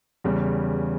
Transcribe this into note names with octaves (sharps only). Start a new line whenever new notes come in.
E2 C#3 G3